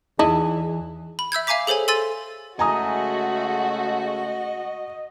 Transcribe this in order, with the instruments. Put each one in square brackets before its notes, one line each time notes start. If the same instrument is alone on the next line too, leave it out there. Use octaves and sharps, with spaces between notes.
[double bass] E2 E3 [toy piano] D#4 [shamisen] E4 D#5 [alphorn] G#4
[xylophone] B5
E5 E6 G6 G#6
E5 F5 G#5 A#5 D6 B6
G#4 A4 C5 C#5 G#5
A4 G#5 C6 E6 A6 D#7
[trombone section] C#3 G#3 A3 [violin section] F#4 [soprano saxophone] D#5 [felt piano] G#5 A#5 D#6